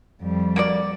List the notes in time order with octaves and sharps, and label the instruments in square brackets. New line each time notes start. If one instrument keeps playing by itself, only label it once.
[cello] F2 G3
[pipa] A#3 F#4 D5